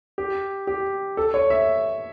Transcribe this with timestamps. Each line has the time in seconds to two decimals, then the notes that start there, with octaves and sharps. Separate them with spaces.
0.18 G4
0.67 G4
1.17 A4
1.34 C#5
1.50 E5